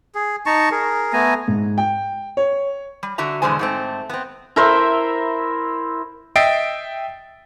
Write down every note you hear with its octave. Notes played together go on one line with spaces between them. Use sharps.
G#4
D#4 A5 A#5 C#6
G#4 A#4
A3 B3 G#5 A#5
G#2
G5
C#5
G3
D3 F#4 E5 A#5
E2 B2 D3 G#3 C5 G#5
G#2 A3 C4
B3 C4
E4 A#4 C5 E5
D#5 E5 G5 A6 C7 D7